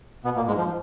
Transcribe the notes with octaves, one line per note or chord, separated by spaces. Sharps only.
B2 B3
A#2 A#3
G#2 G#3
F3